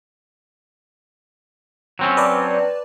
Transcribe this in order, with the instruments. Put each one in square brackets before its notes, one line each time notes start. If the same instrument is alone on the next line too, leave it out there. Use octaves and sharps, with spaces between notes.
[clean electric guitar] F#3 C4 C#4
[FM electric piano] B4 D5 A5